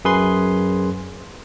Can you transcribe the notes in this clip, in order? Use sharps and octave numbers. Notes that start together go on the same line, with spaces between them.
F#2 G#4 B4 C6